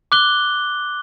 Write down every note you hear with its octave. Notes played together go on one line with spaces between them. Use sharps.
D6 F#6 G7